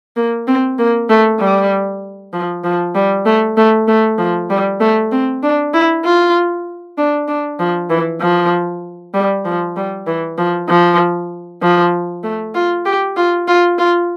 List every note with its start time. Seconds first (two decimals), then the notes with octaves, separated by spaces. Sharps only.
0.16 A#3
0.48 C4
0.78 A#3
1.09 A3
1.40 G3
2.33 F3
2.64 F3
2.95 G3
3.26 A3
3.57 A3
3.88 A3
4.18 F3
4.50 G3
4.80 A3
5.12 C4
5.43 D4
5.74 E4
6.05 F4
6.98 D4
7.28 D4
7.59 F3
7.90 E3
8.21 F3
9.14 G3
9.45 F3
9.76 G3
10.07 E3
10.38 F3
10.69 F3
11.62 F3
12.24 A3
12.55 F4
12.86 G4
13.17 F4
13.48 F4
13.78 F4